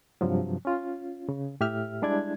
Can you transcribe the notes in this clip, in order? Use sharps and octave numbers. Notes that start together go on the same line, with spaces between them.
G2 C3 F3 F#3
C#4 F4
C#3
A2 G4 E5 F6
G3 G#3 D4 E4 D5 G#6